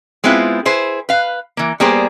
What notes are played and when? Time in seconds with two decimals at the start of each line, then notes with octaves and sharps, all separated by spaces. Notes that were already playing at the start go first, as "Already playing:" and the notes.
0.24 G#3 B3 C4 E4 F4
0.65 E4 G#4 B4 C5
1.09 B4 F5
1.57 E3 A#3
1.80 G3 A#3 B3 G#4 C5